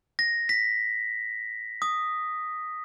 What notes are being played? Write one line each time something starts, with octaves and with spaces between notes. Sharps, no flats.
A#6
B6
D#6